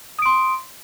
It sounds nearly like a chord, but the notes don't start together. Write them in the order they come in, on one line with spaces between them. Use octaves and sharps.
D#6 D7 C6